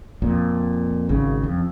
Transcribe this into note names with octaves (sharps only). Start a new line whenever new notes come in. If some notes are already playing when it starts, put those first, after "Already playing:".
F2 A#2
G#1 C#3
F2